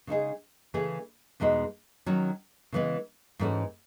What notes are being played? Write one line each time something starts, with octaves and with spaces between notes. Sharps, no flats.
C#3 G#3 D#4 G#4
C#3 E3 A3 E4 G#4
E2 B2 G#3 D#4 F#4
D#3 F#3 C#4 F#4
C#3 E3 G#3 B3
G#2 E3 A3 C#4 F#4